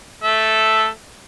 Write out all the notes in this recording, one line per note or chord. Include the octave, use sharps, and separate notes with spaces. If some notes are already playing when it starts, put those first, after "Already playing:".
A3 A4 E5